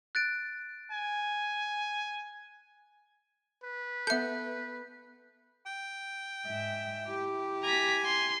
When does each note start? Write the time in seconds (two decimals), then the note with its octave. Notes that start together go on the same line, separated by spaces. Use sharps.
0.15 F#6 A6 D7
0.92 G#5
3.64 B4
4.07 B3 A4 E5 G6
5.66 G5
6.46 G#2 E5
7.03 E4 G4
7.64 G#5 A#5 B6
8.05 C6